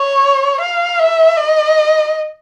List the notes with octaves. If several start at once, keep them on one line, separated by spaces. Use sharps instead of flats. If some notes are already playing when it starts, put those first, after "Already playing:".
Already playing: C#5
F5
E5
D#5